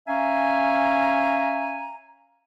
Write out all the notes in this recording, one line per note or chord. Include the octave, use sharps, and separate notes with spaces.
C#4 E5 F5 G#5 A#5